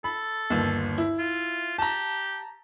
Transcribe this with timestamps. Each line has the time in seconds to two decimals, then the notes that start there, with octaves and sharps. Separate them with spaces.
0.04 A4 B5
0.50 G1 D#2
0.98 E4
1.19 F4
1.78 G4 A5 A#5